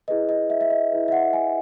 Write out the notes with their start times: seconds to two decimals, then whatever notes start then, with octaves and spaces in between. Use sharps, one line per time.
0.08 E4 G#4 B4 D#5
0.29 D#5
0.50 E5
0.61 E5
0.70 D#5
0.92 E4 G#4 B4
1.08 E5
1.12 F#5
1.33 G#5